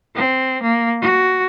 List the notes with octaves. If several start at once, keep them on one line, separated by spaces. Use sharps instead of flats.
C4
A#3
F#4